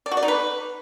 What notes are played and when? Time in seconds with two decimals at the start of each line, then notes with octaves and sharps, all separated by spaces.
0.06 D5
0.11 F#4
0.17 D5
0.23 D#4
0.28 B4